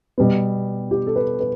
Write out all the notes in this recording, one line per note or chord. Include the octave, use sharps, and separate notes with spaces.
B2 G3 B3
G4
A4
B4
B4